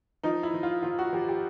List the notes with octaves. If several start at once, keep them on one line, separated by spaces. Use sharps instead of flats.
F3 D#4
E4
F3
F4
F3 F4
F#4
F3 G4
G4